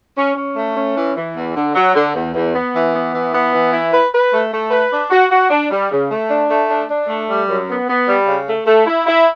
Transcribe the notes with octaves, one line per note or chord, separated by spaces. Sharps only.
C#4
C#4
A3
C#4
E3
E3
E2
D3
F#3
D3
E2
E2
B3
E3
B3
E3
B3
E3
E4
B4
B4
A3
A3
B4
D4
F#4
F#4
D4
G3
C#3
A3
D4
A3
D4
D4
A3
G3
F#2
B3
B3
G3
C#3
A3
A3
E4
E4